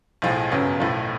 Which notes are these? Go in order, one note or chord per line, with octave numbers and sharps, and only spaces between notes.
B1 A2 F3 G#3
G1 F#2 C#3 F#3 B3
B1 A2 F3 A3